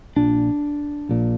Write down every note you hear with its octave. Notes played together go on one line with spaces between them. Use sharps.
A#1 A#2 D4
A#1 A#2